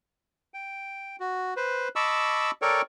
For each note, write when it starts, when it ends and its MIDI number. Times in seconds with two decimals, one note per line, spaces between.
0.54 1.16 79
1.20 1.54 66
1.57 1.88 71
1.57 1.88 72
1.96 2.51 75
1.96 2.51 81
1.96 2.51 83
1.96 2.51 85
1.96 2.51 86
1.96 2.51 88
2.62 2.82 69
2.62 2.82 70
2.62 2.82 73
2.62 2.82 74
2.62 2.82 79
2.62 2.82 85